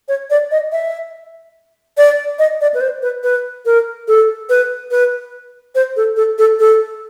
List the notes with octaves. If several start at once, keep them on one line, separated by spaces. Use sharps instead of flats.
C#5
D5
D#5
E5
D5
D#5
D5
B4
C5
B4
B4
A#4
A4
B4
B4
C5
A4
A4
A4
A4